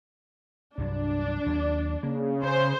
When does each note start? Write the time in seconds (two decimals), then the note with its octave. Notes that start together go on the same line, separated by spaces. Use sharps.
0.78 C2 G2 F#3 D4
1.46 D#2 F#3
2.03 C#3 A#3
2.43 C#4 C5